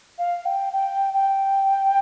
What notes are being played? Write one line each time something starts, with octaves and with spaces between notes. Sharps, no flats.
F5
G5
G5
G5